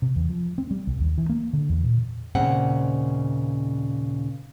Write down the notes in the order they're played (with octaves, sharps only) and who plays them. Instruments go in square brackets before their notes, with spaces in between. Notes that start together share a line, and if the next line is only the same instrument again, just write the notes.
[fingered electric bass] C3
E2
F3
C4
G3
C2
D#2
E3
A#3
D3
E2
A#2
[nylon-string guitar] D#2 A#2 C#3 C4 F#5